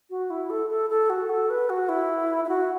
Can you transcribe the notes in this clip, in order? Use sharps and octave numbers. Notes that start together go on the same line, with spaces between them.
F#4
E4
A4
A4
A4
F#4
A4
B4
F#4
E4
E4
F#4